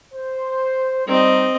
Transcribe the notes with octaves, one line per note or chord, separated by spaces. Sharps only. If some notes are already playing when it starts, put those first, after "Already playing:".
C5
G3 C4 D#4 D#5